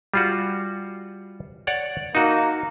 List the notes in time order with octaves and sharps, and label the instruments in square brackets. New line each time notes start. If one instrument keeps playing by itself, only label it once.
[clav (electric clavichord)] G3 F4 F#4
C#5 D5 F#5
[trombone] A#3 [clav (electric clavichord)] D#4 F#4